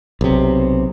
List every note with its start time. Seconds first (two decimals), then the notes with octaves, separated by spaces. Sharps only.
0.21 B1 C3